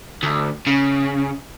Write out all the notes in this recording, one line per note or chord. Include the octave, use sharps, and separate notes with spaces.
D2
C#3